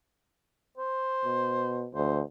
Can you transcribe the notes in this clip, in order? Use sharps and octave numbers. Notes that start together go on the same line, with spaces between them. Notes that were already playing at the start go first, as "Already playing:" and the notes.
C5
B2
D2 C5